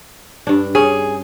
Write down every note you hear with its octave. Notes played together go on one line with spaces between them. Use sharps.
G2 D4
C#4 G#4